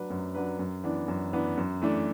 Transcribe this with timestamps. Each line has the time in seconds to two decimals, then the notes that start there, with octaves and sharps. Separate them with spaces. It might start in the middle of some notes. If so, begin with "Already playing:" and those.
Already playing: F#3 D4 B4
0.10 F#2
0.35 F#3 D4 B4
0.59 F#2
0.84 E3 B3 D4
1.08 F#2
1.33 E3 B3 D4
1.57 F#2
1.82 E3 A3 D4